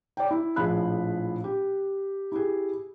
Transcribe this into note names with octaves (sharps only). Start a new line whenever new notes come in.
D5 G5
E4
A#1 A2 F3 G#4 B5 F#6
G4
E4 G4 G#4